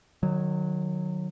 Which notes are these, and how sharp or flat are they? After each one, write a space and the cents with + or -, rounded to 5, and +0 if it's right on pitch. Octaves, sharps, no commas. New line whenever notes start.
D#3 -30 F#3 -10